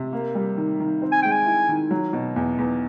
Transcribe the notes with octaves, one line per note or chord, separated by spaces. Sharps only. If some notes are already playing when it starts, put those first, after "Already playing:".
Already playing: C3
A#3
G3
D#3
D#3
C4
G#5
G#3 G5
G#5
E4
D#3
F#3
B2
E2
E2